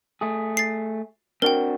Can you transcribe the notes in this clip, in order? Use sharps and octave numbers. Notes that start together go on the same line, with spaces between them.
A3 G#4
A6 C7
C4 D4 F#4 A#4 G5